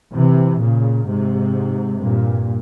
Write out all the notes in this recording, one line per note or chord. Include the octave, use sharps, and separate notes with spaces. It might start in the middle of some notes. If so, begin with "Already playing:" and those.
C3 E3
A#2 C#3
G#2 C3
G2 A#2